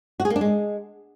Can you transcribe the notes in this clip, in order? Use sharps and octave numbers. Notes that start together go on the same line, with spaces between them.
F#4
G#4
A#3
D4
G#3